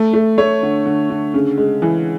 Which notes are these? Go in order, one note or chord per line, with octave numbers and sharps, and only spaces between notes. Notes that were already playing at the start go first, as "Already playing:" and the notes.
Already playing: A3
A3
A3 C#5
D3
D3
D3
C#3
G#3
E3